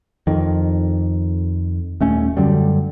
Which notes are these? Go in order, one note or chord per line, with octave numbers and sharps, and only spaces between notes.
F2 D#3
D#1 A3 C#4
F#2 D3 F#3 G3